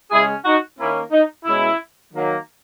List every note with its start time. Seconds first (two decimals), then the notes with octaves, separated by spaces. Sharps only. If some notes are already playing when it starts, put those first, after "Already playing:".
0.11 C#3 G#3 C#4 E4 G#4
0.45 D#4 F#4
0.78 D#3 A#3 C#4 E4
1.11 D#4
1.45 B2 G#3 C#4 E4
2.12 D#3 F#3 A#3